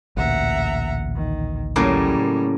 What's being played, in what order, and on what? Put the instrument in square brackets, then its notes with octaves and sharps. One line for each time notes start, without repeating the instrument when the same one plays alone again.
[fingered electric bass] A1 D2 A#2 [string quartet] E5 F#5 A#5
[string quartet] D#3
[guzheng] A2 C#3 A#3 [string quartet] F#3 G3